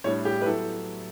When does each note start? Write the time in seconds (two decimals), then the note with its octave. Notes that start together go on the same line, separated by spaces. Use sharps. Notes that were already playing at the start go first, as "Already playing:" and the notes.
0.04 A2 G3 D4 C#5
0.25 G4
0.42 B4
0.46 F#3 B3 E4 A4